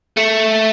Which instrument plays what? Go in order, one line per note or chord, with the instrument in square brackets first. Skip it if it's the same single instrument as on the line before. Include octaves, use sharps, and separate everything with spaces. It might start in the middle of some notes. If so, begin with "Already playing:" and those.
[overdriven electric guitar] A3